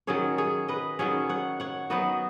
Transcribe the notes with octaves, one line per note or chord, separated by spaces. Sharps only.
D#3 F#3 C#4 G#4 C#5
G#4 C#5
B4 D#5
D#3 F#3 C#4 G#4 C#5
C#5 F#5
C#5 F#5
F#3 B3 D#4 F#4 B4